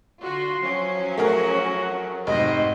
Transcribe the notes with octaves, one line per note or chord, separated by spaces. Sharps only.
D3 F4 F#4 C6
F3 F#3 C#4
A3 F#4 G#4 A#4
F1 G#2 F#4 C5 D#5